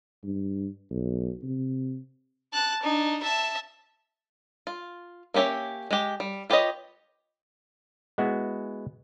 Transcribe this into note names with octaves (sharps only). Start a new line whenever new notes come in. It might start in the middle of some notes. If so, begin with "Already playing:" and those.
G2
B1
C3
A5 F#6
D4 D#4
E5 A5
F4
A#3 C#4 G4 C#5 E5
G#3 G4
G3
F4 G4 B4 C#5 D#5
G#3 B3 E4 F#4